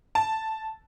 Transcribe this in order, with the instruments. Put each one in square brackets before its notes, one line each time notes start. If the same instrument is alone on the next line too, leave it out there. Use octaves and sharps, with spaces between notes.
[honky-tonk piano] A5